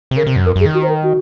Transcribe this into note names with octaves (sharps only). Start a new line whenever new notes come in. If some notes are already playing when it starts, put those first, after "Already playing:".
C3
C#3 A#4
C3
F#2
F2 A#4
F#2
G#4
D#3
F#4
C5
A#4
F#4